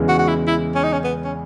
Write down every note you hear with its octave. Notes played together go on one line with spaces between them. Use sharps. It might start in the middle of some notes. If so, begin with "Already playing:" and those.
Already playing: E2 C#3 E3 G#3
F#4
F#4
E4
E4
C#4
D#4
C#4
B3
C#4